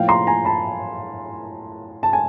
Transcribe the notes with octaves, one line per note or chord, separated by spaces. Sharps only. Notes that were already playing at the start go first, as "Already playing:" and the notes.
Already playing: A2 F3 A#3 F5 G5
A#5 C6
G#5 A#5
A5 B5
A5
G#5